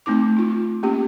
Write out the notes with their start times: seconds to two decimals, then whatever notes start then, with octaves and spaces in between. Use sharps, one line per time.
0.06 A3 C4 D#4 D6
0.36 D#4 F4
0.83 A#3 C#4 G4